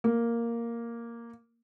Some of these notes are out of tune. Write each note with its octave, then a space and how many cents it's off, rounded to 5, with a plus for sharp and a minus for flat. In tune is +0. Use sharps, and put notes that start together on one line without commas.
A#3 +0